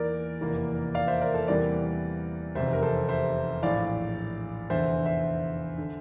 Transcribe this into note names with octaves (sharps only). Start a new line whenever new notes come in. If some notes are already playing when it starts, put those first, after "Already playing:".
Already playing: E2 E3 A#3 A#4 D5
F1 E2 E3 A#3
D5 F5
C5 E5
A#4 D5
A4 C5
E2 C3 E3 G3 A#3 A#4 D5
F1 E2 C3 C5 E5
A#4
A4 C5
C5 E5
A#1 A2 E3 D5 F5
F1 E2 D3 C5 E5
C5 E5
D3